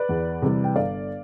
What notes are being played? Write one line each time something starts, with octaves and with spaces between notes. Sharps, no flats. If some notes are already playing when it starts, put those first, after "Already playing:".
Already playing: B4 D5
E2
C3 E3 G3
G5
G1 D5 F5